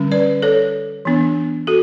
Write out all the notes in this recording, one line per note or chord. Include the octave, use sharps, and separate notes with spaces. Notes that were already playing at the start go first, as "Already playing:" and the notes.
Already playing: D3 G3 C#4
B4 D5
A4 C#5
E3 B3 D4
F#4 A4